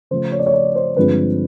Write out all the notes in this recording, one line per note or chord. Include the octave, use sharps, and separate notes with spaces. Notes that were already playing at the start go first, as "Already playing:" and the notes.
C#3 F3 A3 C5
C#5
D5
C#5
D5
C5
G2 D3 F3 G#3 C4 B4